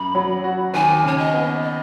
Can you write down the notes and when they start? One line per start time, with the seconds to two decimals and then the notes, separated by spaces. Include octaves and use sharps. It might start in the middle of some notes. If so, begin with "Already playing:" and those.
Already playing: F#2 B5
0.15 F#3
0.44 F#4
0.74 D#2 G#5
1.04 C#3 C#5
1.18 D#5
1.34 B3
1.63 D#5